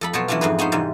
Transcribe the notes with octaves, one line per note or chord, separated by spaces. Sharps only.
F2 A4 B5
B2 F#3 B3 C5 C#5 A5
E3 F#3 C#4 D4 F4
F2 G#2 C4 G#4 B4
B3 C#4 D#4 C5
G#2 C3 E3 G3